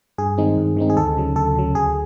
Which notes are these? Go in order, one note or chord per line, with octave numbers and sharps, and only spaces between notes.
G2 G#4
D#3 G#3 C4 D#4
G2
D#3 G#3 C4 D#4
G#4
D2 A4
C#3 F#3
D2 A4
C#3 F#3
D2 G#4